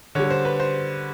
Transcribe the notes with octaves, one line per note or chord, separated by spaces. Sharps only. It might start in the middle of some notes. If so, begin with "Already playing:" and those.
D3 G3 C#5
C5
B4
C5